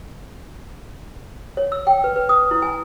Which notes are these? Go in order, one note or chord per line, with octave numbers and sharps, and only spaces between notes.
C#5
E6
G5
B4
B4
D#6
E4
G#5